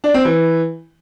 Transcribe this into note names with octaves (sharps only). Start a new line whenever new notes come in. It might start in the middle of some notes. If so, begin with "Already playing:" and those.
D4
C4
E3